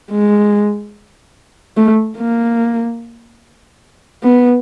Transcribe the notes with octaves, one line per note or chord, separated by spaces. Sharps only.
G#3
A3
A#3
B3